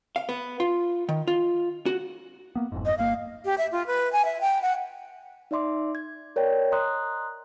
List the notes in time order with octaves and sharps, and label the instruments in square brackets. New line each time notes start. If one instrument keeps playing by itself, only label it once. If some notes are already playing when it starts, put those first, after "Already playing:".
[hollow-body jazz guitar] F5
B3
F4
D#3
F4
F#4
[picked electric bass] A#3 B3
F#1 F2 G#2
[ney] D#5
[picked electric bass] G1 A#3 [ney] F5
[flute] G4
E5
F4
B4
G#5
E5
G5
F#5
[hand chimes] D#4 D5 E5 C6 D6
G#6
A#4 C#5 D5 G5
D#5 A#5 C6 D#6 F#6